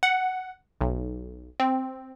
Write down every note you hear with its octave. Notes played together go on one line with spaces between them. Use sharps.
F#5
B1
C4